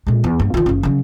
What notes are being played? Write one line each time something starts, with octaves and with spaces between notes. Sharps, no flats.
A#2 G#3
E2
G2 A#3
D#3 F4
F#1 C#3
C#3 F#3